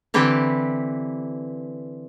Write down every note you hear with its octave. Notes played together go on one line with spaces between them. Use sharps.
D3 E3 C4 G4 B4 G5